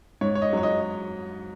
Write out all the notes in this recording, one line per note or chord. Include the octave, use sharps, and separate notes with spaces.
G#2 C#5
C#5
D#5
F#3 C#5
D#5